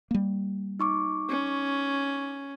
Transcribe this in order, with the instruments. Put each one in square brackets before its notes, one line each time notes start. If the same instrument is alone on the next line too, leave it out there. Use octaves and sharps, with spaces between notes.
[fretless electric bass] G3 A#3
[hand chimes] D#4 C#6 D6
[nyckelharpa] C#4